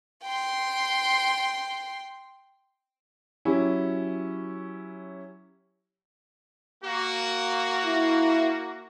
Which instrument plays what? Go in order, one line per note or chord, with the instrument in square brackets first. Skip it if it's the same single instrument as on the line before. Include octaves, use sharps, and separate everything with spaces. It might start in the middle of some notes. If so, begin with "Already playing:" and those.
[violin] G5 C6
[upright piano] F#3 C#4 E4 G4
[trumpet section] A#3 F#4
[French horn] E4